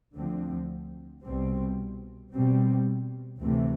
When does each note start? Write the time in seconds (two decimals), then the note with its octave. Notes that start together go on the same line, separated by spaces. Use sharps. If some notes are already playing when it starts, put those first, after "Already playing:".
0.16 D2 D3 F3 C4
1.25 C2 B2 G3 C4
2.33 B2 G3 C4
3.42 D2 C3 E3 A3 C4